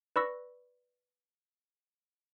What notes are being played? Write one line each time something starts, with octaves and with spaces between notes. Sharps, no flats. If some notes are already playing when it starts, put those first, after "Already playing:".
B4 D5 B5 C#6 E6 A#6